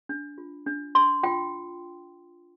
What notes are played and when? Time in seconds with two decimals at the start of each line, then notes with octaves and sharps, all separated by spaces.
0.09 D4
0.38 F4
0.66 D4
0.95 D4 C6
1.23 F4 G5